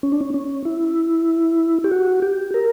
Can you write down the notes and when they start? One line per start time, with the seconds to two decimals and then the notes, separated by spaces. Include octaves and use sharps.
0.03 C#4
0.12 D4
0.21 C#4
0.34 C#4
0.65 E4
1.84 G4
1.92 F#4
2.22 G4
2.54 A#4